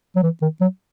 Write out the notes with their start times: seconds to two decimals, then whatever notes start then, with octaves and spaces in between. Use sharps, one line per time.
0.16 F#3
0.23 E3
0.42 D#3
0.61 F#3